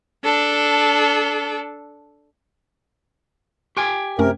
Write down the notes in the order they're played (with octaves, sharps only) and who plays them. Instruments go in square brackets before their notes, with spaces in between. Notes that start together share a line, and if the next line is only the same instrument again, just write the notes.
[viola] D4 A4
[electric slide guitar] G4 G5 G#5 [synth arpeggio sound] C6 F6
[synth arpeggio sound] F#2 A3 C#4 [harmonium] C3 A#4